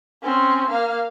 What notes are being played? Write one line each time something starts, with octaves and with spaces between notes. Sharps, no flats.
C4 C#4
A#3 F5